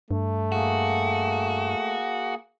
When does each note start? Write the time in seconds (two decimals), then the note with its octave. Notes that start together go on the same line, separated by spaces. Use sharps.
0.11 G2 A3
0.52 A#3 F#4 G#4